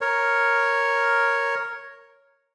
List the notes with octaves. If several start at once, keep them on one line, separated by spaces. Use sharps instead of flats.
A#4 C#5